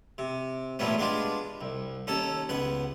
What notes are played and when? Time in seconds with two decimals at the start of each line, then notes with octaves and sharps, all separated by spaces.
0.18 C3
0.79 E2 A#2 G3 A3 B3 C#4
0.98 G#3 B3 D4 F4 G4
1.61 C2
2.07 D#2 C#4 A4
2.49 C#2 B3 F#5